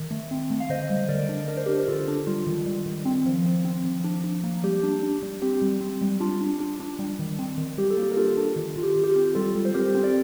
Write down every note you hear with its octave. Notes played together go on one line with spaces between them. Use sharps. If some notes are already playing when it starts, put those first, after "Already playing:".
Already playing: D#3
A3
C4
A3
F5
D3 C5 D#5
G3
D3 A#4 D5
D4
D4 A#4
C5
D4 G4 A#4
A#4
D3 F4 A4
D4
G3 F4
D#3
G3
D#3
C4
F3
C4
C4
F3
D4
D4
A#3
G3 G4
D4
D4
G3
C4 G4
G3
C4
G3
D4 F4
D4
D4
D4
G3
D#3
C4
D#3
G3 G4
A4
A#3
G4
A#4
D4 F4 A4
D4
D#3
D#3 F4
G4
D#3
G4
F4
C4
G3 F4 A4
G3
C5
C4 G4 A#4
C4
D5